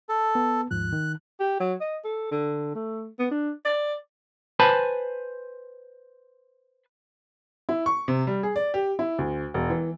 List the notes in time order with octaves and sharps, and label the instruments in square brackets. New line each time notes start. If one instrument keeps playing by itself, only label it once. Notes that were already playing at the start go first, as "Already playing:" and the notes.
[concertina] A4
[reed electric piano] B3
[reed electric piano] D#2 G#2 F3 [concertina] F#6
[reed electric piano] D#3
[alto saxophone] G4
F#3
D#5
A4
D3
A3
B3
D4
D5
[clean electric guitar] B4 C5 G#5 A5 B5
[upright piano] E4
C#6
C3
G3
G#4
D5
G4
E4
D2
E1
E3